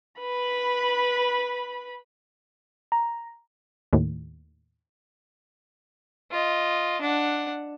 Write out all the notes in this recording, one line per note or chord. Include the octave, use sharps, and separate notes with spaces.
B4 B5
A#5
D#2 A2
F4 D#5
D4 F#5